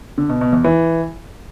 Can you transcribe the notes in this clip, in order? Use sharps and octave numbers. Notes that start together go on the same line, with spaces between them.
D3
B2
B2
E2
E3